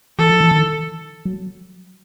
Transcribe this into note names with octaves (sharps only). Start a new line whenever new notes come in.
E3 A4
F3
E3
D#3
F#3